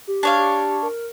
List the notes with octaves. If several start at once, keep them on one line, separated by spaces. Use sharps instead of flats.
G4
D4 C#5 F5
G4
A#4